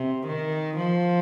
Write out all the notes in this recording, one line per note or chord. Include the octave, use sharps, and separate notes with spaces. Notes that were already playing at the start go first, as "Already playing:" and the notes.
Already playing: C3
D#3
F3